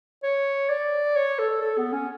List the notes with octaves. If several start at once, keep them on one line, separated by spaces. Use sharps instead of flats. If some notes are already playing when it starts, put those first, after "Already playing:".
C#5
D5
C#5
A4
A4
B3
C#4